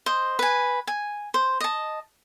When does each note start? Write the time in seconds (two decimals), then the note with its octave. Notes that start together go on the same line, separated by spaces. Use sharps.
0.06 C5 D#5
0.39 B4 G#5
0.87 G#5
1.34 C5
1.60 D#5 A5